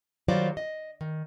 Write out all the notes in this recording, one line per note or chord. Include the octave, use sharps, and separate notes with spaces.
D#3 F#3 G3 F4 C5 D5
D#5
D#3